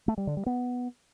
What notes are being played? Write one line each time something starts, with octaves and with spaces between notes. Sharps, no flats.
A3
G3
D3
G3
B3